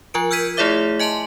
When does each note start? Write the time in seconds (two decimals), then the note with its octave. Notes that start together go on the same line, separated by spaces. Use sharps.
0.14 F3 F4 A#4 D7
0.31 E6 F6 G6 G#6 B6 D#7
0.57 A3 E4 G#4 C#5 E5 D6
0.99 D#5 G#5 A5 C6 F#7